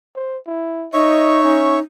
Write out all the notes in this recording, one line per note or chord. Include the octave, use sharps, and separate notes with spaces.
C5
E4
D#4 C#5 D#5 E5 C#6
C#4